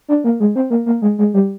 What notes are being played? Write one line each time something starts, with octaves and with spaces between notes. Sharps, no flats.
D4
A#3
G#3
C4
A#3
A#3
G#3
G#3
G3